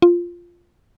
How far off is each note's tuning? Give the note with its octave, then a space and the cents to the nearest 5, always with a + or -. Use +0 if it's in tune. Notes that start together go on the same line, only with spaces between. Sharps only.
F4 -5